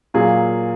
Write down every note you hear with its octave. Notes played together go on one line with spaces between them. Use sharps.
A#2 F#3 A#3 F4 G#4